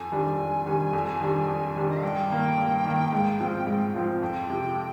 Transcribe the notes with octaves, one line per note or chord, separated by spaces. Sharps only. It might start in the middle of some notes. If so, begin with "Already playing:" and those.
Already playing: F2 G#5
D#3 G3 D4
F2
D#3 G3 D4
F2
D#3 G3 D4
F2
D#3 G3 D4
D#5
F5
G2 G5
D#3 A#3
G2
D#3 A#3
G#2
F3 C4 F4
G#2
F3 C4 F4
F2 G5
C3 F3